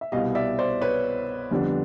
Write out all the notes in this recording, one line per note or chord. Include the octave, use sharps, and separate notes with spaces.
E5
C2 B2 G3 D#5 F5
D5 E5
C5 D5
B4 C#5
F2 D3 G3 B3 D4